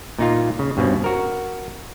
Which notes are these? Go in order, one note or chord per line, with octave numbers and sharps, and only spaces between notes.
A#2 D#4 F4
C#3
G2 B2 C4 C#4
F#4 A#4